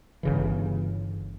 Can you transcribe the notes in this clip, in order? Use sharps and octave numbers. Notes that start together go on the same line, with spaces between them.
G1 C#3 E3